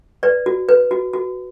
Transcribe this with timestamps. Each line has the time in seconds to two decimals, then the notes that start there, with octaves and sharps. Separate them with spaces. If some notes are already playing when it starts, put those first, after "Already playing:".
0.23 B4 D5
0.46 F#4
0.69 B4
0.91 F#4
1.13 F#4